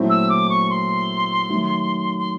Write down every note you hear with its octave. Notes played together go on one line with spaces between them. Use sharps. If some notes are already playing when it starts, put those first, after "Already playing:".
Already playing: A#2 F#3 A3 C4 E4
E6
D6
C#6
C6
D#3 F#3 A3
C6